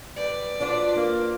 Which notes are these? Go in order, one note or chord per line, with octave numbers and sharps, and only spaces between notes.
G3 B4 D5
F3 D4 F4 F#4
A#3